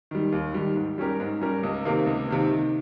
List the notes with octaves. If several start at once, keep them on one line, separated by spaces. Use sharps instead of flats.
D#3 G3
D#2
D#3 G3
G#2
G3 C#4 G4 A#4
G#2
G3 C#4 G4 A#4
C#2
C3 D#3 A#3
C#2
C3 D#3 A#3
D#3